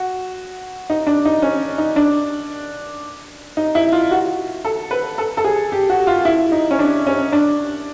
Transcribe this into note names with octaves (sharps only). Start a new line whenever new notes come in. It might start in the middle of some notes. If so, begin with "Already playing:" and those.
Already playing: F#4
D#4
D4
D#4
C#4
D#4
D4
D#4
E4
F4
F#4
A4
B4
A4
A4
G#4
G4
F#4
F4
E4
D#4
C#4
D4
C#4
D4